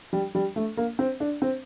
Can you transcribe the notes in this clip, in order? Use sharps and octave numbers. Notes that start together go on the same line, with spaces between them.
G3
G3
A3
A#3
C4
D4
C4